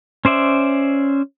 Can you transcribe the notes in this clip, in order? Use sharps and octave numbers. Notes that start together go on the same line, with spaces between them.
C#4 C5 D5 E5